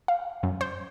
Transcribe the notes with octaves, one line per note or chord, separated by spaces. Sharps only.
F5
F#2
C5